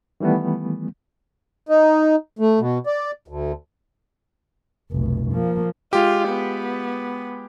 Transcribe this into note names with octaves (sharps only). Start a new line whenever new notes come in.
D#3 E3 G3 A3 B3
D#4
A3
B2
D5
D2
F1 B1
F3 A#3
G#3 F4 G4
B3